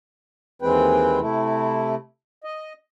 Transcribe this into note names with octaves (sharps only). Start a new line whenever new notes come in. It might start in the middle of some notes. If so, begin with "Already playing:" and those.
D#2 E3 G#3 C4 B4 G5
C3 A3 E4
D#5